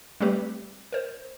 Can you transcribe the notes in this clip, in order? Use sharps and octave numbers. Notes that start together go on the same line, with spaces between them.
G3 A3 C4 G4 B4
A#4 C5